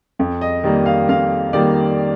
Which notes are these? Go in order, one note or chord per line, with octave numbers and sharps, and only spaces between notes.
F2
D#5
D#3 G3 A#3
F5
F2 F5
D#3 G3 A#3 D5